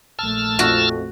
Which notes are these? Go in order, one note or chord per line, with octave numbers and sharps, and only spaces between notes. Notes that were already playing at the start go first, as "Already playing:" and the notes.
A#1 A3 A5 E6 F6
F2 F#4